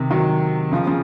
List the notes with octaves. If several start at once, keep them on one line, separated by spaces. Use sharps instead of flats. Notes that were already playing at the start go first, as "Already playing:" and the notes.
Already playing: C3 D#3
D#3 F#3
C#3 F3
C#3 F3